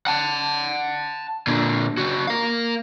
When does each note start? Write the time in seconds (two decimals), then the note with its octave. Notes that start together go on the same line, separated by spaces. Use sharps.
0.07 F#5 A5
1.47 A#2 D3
1.97 C#3 F#4
2.27 A#4 F5